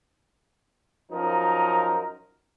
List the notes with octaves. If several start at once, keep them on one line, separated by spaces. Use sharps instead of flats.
F#2 F3 D#4 A#4